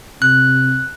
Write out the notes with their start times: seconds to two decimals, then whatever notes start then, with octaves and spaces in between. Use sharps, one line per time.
0.22 C3 F#6